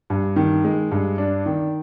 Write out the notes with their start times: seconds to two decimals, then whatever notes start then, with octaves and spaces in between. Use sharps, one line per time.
0.10 G2
0.36 D#3
0.65 G#3
0.91 G2
1.18 D4
1.46 D#3